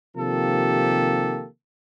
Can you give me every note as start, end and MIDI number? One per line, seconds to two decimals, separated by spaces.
0.16 1.45 48
0.16 1.45 51
0.16 1.45 53
0.16 1.45 58
0.16 1.45 67
0.16 1.45 69